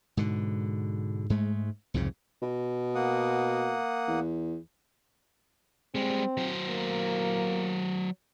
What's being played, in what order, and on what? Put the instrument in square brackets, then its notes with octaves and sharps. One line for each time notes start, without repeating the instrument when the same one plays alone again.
[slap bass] G#2 B2 D3
G#2 G#3 A3
C2 F2 G#2 C#3
[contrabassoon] B2
[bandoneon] A#3 F#5 D#6
[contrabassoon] E2
[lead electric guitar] G3 G#3 [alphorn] C4
[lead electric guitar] F#3 C5
[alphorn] A#3